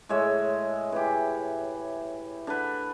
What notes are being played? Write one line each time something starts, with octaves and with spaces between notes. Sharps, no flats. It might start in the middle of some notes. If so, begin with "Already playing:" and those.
A2 G#3 C#5 E5
E3 G4
D3 B4